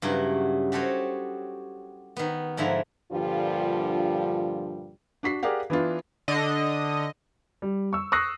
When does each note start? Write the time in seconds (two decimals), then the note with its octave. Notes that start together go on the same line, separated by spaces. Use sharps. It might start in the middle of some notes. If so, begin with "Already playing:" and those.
0.02 G2 C#3 F#3 E4 F#4
0.72 F#4 G4 A4 C5 C#5 D#5
2.17 D#3 B3
2.57 G#2 D3 F3 E4 E5 A#5
3.13 G2 A#2 D3 F3 G3 F4
5.23 D4 F#4 B6 C7
5.43 G4 G#4 A#4 D5 F5 F#5
5.70 E3 B3 D4 F4
6.28 D3 D#5
7.62 G3
7.93 C#6 E6
8.12 C#6 D#6 E6 F#6 A#6 C7